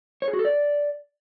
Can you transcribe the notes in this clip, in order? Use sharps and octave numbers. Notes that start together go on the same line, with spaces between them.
C#5
G#4
F#4
A4
D5